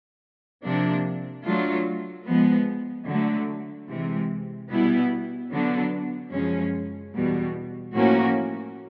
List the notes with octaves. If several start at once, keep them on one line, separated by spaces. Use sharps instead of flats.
C3 F3 A#3 D4
F#3 A3 D4 F4
F3 G#3 B3
D3 F#3 A3
C3 E3 G#3
B2 G3 B3 E4
D3 F#3 B3 D4
F#2 C#3 F3 G#3 C#4
E2 B2 G3
A2 F3 A#3 C#4 F#4